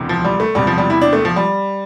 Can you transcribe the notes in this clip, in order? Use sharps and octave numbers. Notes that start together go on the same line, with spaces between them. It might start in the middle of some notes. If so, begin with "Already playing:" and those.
Already playing: E1 D2 C3 E3
F3
G3
A3
E1 E2 C3 G3
F3
G3
E4
D4
A3
F3
G3